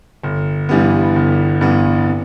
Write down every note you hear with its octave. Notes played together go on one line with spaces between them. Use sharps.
G1
G2 E3 G3 B3
G1
G2 E3 G3 B3
C3